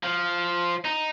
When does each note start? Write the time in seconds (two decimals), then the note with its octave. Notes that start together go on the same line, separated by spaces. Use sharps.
0.03 F3
0.85 D#4